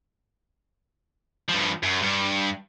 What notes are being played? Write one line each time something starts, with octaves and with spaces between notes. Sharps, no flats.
G2 F3
F#2
G2